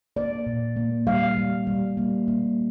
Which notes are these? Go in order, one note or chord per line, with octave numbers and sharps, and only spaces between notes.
A#3 D5
A#2
A#3
G3 F5
G3
G3
A#3
A#3